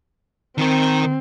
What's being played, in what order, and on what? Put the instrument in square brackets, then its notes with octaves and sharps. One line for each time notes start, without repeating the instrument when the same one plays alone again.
[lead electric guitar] D#3 A#4 [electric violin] C4